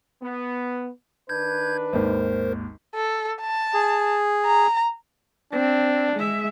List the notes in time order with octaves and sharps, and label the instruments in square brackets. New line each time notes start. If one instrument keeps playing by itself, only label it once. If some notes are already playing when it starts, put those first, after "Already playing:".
[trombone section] B3
[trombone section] D#3 D4 B4 [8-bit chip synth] G6 G#6
[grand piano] G#1 D#2 [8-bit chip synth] A#4 C5
[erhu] A4
A5
[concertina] G#4
[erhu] A#5
[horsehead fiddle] C4 [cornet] D4
[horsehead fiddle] G#3 E5